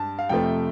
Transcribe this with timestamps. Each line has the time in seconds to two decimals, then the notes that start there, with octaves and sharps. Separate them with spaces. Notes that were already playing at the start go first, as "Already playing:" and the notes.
Already playing: G2 A5
0.19 F5
0.29 F2 C3 F3 A3 G5